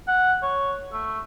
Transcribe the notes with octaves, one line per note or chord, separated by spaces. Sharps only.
F#5
C#5
A3